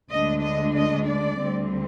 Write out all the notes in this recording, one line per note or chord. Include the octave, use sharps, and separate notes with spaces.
D2 D3 G#3 D4 D#5
D#5
D#5
D5
D2 D3 G3 C4